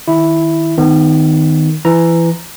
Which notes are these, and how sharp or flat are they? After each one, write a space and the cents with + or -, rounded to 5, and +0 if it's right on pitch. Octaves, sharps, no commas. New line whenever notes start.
D#3 +10 E4 +0
D#3 +0 B3 +35
E3 +20 A#5 -5